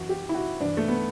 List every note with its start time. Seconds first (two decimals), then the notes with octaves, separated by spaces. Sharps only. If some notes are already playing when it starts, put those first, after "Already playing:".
Already playing: F#2 E3 F#4
0.09 G4
0.29 E4
0.35 F#4
0.60 G2 E3 D4
0.77 A3
0.88 B3